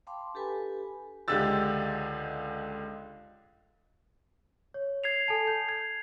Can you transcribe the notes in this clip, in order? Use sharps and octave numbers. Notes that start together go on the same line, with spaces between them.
F5 G5 A5 B5 C6 D6
D4 G4 A4 B4 G#5 B5
C#2 D3 G#3 G4 E6 A6
C#5
G#6 C7 F7
A4 G#5 A5
G6
G#6